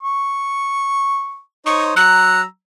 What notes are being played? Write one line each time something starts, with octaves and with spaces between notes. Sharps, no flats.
C#6
D#4 C5 C#5 C#6
F#3 A#5 E6 F#6